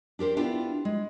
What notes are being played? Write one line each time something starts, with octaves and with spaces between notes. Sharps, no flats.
D4 G4 A#4 C5
B3 D4 E4 F4 G4
G#3